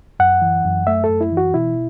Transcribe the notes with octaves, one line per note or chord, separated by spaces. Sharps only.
F#2 F#5
E3
F#2
A3 E5
A4
F#2
E4
E3
F#4
B2 E4